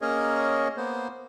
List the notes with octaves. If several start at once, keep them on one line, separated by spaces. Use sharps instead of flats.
A#3 C#4 G#4 A#4 C#5 D#5
A#3 B3 C5